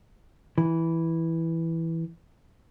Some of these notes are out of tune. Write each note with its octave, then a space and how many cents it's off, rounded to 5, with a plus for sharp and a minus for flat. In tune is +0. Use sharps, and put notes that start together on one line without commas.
E3 -5